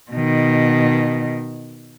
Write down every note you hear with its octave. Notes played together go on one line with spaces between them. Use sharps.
B2 D#3